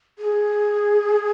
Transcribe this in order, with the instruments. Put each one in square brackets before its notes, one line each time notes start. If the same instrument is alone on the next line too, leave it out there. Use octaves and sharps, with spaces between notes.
[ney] G#4